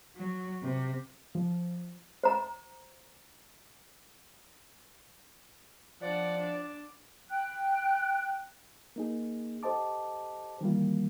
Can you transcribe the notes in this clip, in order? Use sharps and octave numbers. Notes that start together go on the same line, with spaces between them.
F#3
C3
F3
C5 A#5
F3 D4 D5 F#5
D4
G5 F#6
A#3 D#4 G#4
G4 A4 C5 D#5 A5 D6
D#3 E3 G3 A#3 F4